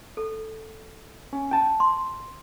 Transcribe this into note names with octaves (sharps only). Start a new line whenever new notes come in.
A4
C#4
G5 A5
C6